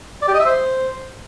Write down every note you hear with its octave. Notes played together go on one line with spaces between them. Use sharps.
D5
G4
D#5
E5
C5